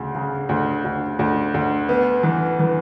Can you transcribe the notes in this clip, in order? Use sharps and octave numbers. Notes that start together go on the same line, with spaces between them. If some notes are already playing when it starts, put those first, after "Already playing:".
Already playing: D2 C#3
C#3
D2
D2
D2
D2
B3
E3
E3